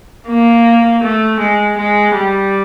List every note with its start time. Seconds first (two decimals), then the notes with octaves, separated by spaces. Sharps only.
0.28 A#3
1.03 A3
1.40 G#3
1.77 G#3
2.15 G3